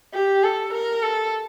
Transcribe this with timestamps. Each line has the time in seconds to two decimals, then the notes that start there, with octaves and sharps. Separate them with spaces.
0.14 G4
0.44 A4
0.73 A#4
1.03 A4